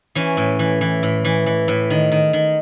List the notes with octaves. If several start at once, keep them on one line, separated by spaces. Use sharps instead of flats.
E3 C#4
A2
E3
E3
A2
E3
E3
A2
D#3
D#3
D#3